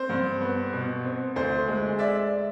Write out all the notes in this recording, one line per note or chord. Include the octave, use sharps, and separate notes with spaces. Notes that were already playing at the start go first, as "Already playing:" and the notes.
Already playing: C4 C5
G2
B3
B2
C4
D2 C5
G#3
D5 E5